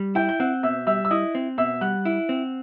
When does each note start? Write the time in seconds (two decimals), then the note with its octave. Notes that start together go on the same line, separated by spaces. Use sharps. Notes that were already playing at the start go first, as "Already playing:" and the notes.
Already playing: G3
0.15 E4 G5 G6
0.29 G6
0.40 C4 F#5 F#6
0.63 B2 E5 E6
0.87 G3 E5 E6
1.05 E6
1.10 E4 D#5 D#6
1.35 C4
1.58 B2 E5 E6
1.81 G3 F#5 F#6
2.05 E4
2.29 C4